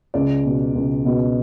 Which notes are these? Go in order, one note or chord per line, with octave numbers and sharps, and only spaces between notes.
C#2 D5
B2
C#2
B2